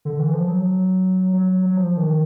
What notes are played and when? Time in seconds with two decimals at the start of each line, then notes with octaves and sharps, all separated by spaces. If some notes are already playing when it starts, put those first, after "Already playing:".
0.05 D3
0.19 E3
0.34 F3
0.47 F#3
1.33 F#3
1.66 F#3
1.77 F3
1.97 D#3